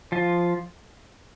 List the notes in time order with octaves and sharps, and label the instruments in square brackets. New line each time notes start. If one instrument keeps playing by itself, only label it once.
[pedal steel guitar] F3 F4